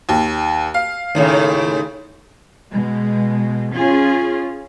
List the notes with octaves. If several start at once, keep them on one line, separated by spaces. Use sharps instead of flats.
D#2
F5
D#2 A2 C#3
B2 G#3
C#4 F4 G#4